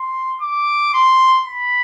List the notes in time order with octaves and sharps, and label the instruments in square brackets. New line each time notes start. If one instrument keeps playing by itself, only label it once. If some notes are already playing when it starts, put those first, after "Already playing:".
Already playing: [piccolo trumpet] C6
D6
C6
B5